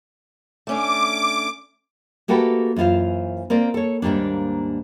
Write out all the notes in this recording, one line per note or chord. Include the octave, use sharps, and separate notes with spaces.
A3 C#4 D4 D6
A3 A#3 F#4 G4 A4 B4
F#2 E3 F4 C5 F5
A#3 C4 A#4 D5
A4 C#5
D#2 G#2 G3 A#3 D4